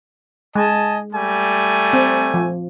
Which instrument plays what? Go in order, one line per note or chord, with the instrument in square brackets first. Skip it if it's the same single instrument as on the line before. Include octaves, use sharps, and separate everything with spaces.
[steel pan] G#3 [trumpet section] D#5 G#5 A5
[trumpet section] G3 A3 G#5
[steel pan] C4
F3